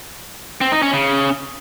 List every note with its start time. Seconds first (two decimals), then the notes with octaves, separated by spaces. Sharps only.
0.61 C4
0.72 D#4
0.82 C#4
0.93 C#3